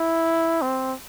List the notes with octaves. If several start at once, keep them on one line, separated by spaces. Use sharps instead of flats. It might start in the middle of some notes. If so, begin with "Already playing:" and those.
Already playing: E4
C4